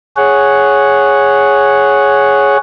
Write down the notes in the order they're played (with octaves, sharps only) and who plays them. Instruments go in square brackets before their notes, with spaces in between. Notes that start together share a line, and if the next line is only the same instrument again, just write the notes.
[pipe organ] G#4 C#5 F#5